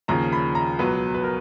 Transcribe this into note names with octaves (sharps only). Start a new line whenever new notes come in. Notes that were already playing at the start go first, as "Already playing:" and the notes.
D#2 C#3 F3 A#5
B5
A#5
C#2 B2 F#3 B4
B4
A#4